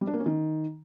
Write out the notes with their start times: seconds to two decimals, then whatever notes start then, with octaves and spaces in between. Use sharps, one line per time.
0.01 G3
0.07 D4
0.14 A#3
0.20 C#4
0.26 D#3